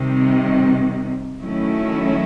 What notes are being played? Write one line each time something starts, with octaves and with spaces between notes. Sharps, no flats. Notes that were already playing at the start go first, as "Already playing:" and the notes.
Already playing: C3 D#3 G3
D#3 F#3 A3 C#4 E4